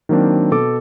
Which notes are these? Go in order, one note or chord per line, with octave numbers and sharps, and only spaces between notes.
D#3 F#3 A#3 C4 D4
B2 A4 D6